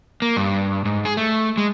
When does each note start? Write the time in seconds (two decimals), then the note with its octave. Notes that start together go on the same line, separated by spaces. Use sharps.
0.22 A#3
0.37 G2
0.85 G#2
1.05 G#4
1.17 A3
1.58 G#3